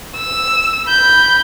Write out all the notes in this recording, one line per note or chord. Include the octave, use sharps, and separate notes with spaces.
E6
B5 G6